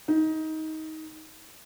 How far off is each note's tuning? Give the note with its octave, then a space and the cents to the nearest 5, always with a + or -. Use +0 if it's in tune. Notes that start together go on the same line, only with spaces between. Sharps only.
D#4 +20